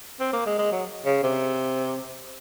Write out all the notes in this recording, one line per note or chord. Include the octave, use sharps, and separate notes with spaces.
C4
A#3
G#3
G#3
F#3
C#3
C3